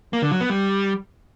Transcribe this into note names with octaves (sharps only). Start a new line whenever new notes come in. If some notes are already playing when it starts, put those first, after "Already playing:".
A#3
D3
F#3
B3
G3